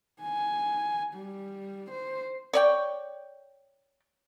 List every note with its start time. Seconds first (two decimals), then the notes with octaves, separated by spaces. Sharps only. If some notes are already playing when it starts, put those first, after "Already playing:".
0.22 G#5
1.15 G3
1.91 C5
2.53 C#5 D5 G5